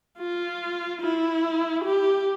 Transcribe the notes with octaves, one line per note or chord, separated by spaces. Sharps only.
F4
E4
G4